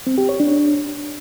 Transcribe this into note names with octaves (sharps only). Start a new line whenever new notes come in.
C4
G4
C#5
D4